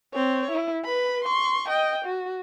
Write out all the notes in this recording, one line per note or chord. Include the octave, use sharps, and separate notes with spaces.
C4 C#5
E4
B4 B5
C6 C#6
D#5 G5
F#4